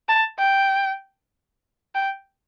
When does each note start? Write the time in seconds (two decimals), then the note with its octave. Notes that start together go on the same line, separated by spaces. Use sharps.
0.09 A5
0.39 G5
1.95 G5